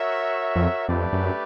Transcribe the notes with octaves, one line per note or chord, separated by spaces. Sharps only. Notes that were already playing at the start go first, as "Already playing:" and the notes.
Already playing: F#4 A#4 C#5 E5
F2
F2 A3 D4 G4 B4 D5
F#2